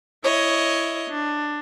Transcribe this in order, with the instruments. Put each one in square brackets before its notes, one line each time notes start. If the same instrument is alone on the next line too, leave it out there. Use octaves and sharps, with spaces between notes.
[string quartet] E4 C#5 D#5
D4